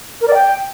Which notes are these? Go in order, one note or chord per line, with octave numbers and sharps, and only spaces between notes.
A#4
D5
G5